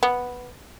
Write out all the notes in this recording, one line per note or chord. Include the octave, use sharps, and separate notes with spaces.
B3